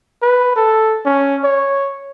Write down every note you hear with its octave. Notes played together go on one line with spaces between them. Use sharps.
B4
A4
C#4
C#5